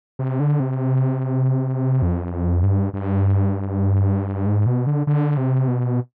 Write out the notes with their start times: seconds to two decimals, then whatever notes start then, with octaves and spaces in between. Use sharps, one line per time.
0.19 C3
0.40 D3
0.60 C3
2.02 F2
2.63 G2
2.93 G2
4.46 G#2
4.66 B2
4.87 D3
5.07 D3
5.37 C3
5.68 B2